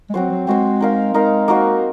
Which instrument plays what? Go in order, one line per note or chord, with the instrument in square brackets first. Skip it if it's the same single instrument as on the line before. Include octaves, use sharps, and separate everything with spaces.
[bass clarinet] G#3
[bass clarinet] F#3 [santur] C4 F#4 C5
[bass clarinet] F#3
[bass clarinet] G#3 [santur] C4 F#4 C5
[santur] D#4 A#4 F5
[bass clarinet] G#3 [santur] D#4 A#4 F5
[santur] A#3 D#4 F#4 C5